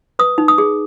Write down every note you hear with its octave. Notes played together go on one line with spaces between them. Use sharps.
B4 D#6
D#4
D#6
G#4